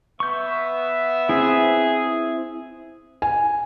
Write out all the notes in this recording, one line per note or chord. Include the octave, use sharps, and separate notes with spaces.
B3 E5 C#6 G6
C4 E4 G#4
G#5